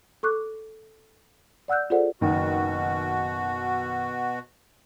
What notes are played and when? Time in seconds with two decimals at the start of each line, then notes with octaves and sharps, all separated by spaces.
0.23 A4 C#6 D6 F#6
1.68 D5 F#5 E6 F#6 G6
1.90 F4 G#4 A4 C5 D5 F#5
2.21 F#1 B2 D#3 F#4